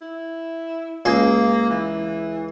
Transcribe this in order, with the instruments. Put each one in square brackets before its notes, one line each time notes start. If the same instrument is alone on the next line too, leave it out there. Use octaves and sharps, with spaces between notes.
[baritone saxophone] E4
[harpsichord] C#2 G#4 C6 [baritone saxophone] A#3
[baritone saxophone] E3